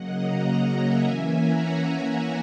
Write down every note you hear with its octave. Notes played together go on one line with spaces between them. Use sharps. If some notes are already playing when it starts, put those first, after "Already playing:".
Already playing: C#3 F#3 A#3 D#5 F#5
F#5 A#5
E5 G#5
E3 A#3 C#4 E5 G#5
F#5 A#5